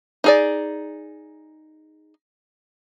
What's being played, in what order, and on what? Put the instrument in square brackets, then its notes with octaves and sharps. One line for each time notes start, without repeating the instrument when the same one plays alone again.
[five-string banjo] D#4 G#4 D5